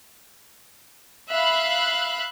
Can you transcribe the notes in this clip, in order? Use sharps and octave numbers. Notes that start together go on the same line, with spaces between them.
E5 F5 B5 F#6